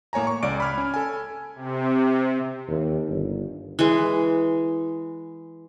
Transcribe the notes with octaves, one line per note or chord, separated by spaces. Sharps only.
A2 A#3 C#5 G#5 A#5
C#6
C#2 D5 D6 D7
B5 F6 G#6
C#4
A4 G#5
C3
D#2
G1
E3 G#3